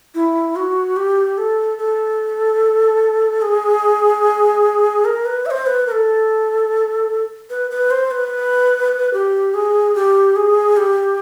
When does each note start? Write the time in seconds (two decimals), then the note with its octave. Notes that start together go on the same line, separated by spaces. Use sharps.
0.15 E4
0.56 F#4
0.96 G4
1.38 A4
1.78 A4
3.42 G#4
5.05 A#4
5.26 B4
5.46 E5
5.51 C5
5.67 B4
5.87 A#4
5.92 A4
7.50 B4
7.71 B4
7.91 C5
8.11 B4
9.14 G4
9.54 G#4
9.95 G4
10.36 G#4
10.77 G4